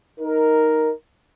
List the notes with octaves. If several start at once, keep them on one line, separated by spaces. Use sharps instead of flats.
D#4 A#4